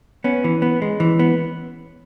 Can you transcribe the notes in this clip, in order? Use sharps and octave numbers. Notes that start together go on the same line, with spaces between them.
B3 C#4
E3
B3
G#3
E3
B3